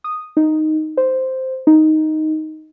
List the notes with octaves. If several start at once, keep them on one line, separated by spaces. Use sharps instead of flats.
D#6
D#4
C5
D#4